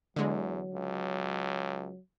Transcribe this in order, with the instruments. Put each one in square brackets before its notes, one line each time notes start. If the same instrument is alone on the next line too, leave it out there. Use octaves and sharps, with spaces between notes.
[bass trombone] E2 [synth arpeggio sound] D3 G#3 [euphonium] F#3
[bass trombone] C#2